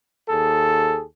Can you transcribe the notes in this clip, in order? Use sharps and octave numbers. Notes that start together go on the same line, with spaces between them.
D#2 G#4 A4